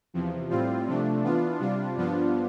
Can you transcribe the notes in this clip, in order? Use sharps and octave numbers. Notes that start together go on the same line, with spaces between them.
E2 C3 F3
A2 G3 C4 F4
C3 F3 A3 D4
E3 B3 D4 F4
C3 G3 D4 F4
G2 F3 B3 D4 F4